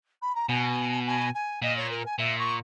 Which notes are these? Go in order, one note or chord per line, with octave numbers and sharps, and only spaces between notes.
B5
A#5
B2 G#5
G#5
G#5
A#2 D#5
C#5
A#4
G#5
A#2 E5
C#6